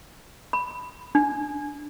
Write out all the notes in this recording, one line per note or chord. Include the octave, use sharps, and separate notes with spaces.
B5
D4